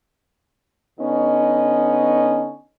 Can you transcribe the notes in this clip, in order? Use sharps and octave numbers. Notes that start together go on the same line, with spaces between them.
D3 B3 C#4 D#4 D#5